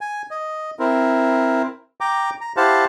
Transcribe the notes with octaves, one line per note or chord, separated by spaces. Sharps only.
G#5
D#5
C4 E4 A#4
G5 A#5 D6
A#5
E4 G4 C5 F5 F#5 A5